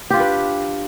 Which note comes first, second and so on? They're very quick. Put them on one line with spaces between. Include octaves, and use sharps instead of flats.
G4 F4 D4 B4